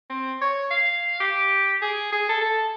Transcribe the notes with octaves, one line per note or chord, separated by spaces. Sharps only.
C4
C#5
F5
G4
G#4
G#4
A4
A4